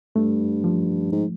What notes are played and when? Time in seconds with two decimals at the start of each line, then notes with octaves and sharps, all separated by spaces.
0.16 G2 A3
0.64 F3
1.12 G#2